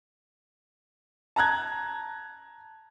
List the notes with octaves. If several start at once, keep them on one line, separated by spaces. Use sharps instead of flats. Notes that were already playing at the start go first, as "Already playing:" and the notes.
A5 A#5 F#6 G#6